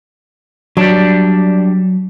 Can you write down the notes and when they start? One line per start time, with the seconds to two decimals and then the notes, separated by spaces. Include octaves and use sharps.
0.77 F#3 G3 D4